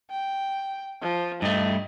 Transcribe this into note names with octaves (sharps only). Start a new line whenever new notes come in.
G5
F3
G2 A3 D#5